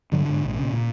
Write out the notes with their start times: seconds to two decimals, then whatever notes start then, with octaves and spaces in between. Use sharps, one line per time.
0.12 G2 D3 F#3
0.25 G#2 D3
0.45 A#1 G#2
0.59 A#2 C#3
0.73 A#2